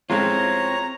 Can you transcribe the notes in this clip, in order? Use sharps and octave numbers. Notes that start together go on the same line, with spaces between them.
A1 G#3 C4 F4 C#5 A#5